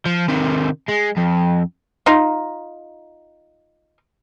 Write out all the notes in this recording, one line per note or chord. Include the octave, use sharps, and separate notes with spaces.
F3
C3 D#3
G#3
F2
D#4 F4